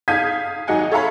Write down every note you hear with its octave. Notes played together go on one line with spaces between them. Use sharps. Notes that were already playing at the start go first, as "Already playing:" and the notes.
F5 D#6 G6 G#6 B6 D#7
G#1 F#3 D#4 F#5 G#5
A4 C#5 E5 F5 A#5 B5